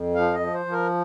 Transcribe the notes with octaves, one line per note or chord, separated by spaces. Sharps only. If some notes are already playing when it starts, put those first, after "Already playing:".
Already playing: F2
F3 F5
D#5
F3
C5
F3
A#4